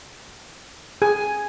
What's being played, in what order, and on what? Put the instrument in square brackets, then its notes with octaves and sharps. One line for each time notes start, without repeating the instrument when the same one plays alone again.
[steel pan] G#4 [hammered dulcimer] G#5